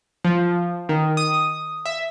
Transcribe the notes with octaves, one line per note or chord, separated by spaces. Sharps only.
F3
D#3
D#6
E5